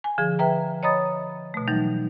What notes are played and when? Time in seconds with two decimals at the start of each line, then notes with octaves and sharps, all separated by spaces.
0.04 G#5
0.18 D3 F3 G#4
0.39 B4 E5 G5 A#5
0.83 C#5 D#5 A#5 B5 D#6 A6
1.54 B2 A3
1.68 E3 F#3 G3 D#4